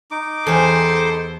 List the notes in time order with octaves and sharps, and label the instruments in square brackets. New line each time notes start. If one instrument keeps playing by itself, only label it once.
[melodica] D#4 D6
[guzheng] E2 G4 [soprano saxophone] A4 [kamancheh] C5